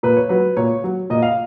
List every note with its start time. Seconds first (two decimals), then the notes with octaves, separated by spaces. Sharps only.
0.03 A#2 B4
0.16 C#5
0.29 F#3 B4
0.57 A#2 C#5
0.84 F#3
1.10 A#2 D#5
1.22 F5